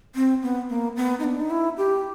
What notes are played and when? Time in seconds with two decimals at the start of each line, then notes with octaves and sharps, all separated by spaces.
0.15 C4
0.43 B3
0.70 A#3
0.96 B3
1.20 D#4
1.24 D4
1.40 D#4
1.50 E4
1.77 G4